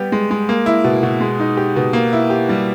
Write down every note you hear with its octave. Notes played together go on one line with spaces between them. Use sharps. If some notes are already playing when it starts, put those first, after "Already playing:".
Already playing: G3 B3 G4
G#3
G#3
A#3
E4
B2
B2
G#3
D#4
G4
B2
A#3
E4
G4
G3